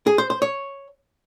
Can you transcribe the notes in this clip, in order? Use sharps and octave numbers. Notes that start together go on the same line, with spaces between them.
G#4
C5
C5
C#5